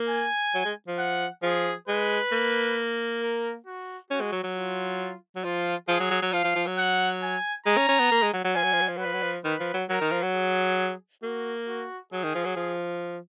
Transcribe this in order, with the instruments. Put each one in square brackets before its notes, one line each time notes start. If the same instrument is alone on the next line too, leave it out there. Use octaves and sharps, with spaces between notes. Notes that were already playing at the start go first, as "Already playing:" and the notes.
Already playing: [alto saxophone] A#3
[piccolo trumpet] G#5
[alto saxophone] F#3
G#3
F3
[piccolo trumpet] F#5
[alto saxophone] F3 [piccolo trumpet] G#4
[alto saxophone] G#3 [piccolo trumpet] B4
[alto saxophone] A#3
[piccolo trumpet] A#4
F#4
[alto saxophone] C#4 [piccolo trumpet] F#4
[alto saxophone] G#3
F#3
F#3
[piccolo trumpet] F4
[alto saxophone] F#3
[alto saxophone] F3 [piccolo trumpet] F4
[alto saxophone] F3 [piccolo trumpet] G#4
[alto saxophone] F#3
F#3
F#3
[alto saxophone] F3 [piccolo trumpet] F5
[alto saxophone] F3
F3
F#3
[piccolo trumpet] F#5
G#5
[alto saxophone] G#3 [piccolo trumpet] A#5
[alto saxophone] C#4
C#4
B3
A#3
G#3
F#3
F#3
[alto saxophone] F3 [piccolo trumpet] G#5
[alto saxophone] F#3
F3
F#3
F3
F#3
[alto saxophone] F3 [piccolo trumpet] B4
[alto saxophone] F#3
F3
[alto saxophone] D#3 [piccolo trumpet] B4
[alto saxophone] F3
F#3
[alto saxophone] F#3 [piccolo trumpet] A#4
[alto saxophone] D#3
F3
F#3
[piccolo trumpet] G#4
[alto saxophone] A#3 [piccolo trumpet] F#4
[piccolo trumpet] F#4
[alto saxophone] F#3 [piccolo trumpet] G#4
[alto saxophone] D#3
F3
F#3
F3